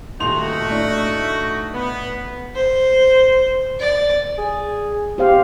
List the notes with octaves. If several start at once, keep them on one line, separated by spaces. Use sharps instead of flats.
D#1 A3 D#4 F#4 C6 F7
A2 D4
B3
C5
D5
G#4
C4 G4 C5 F5